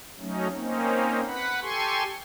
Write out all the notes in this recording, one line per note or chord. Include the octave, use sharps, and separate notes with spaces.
F#3 A3 C#4 D#4
A#3 C4 C#4 D#4
B4 F#5 B5
G4 A4 G#5 C6 C#6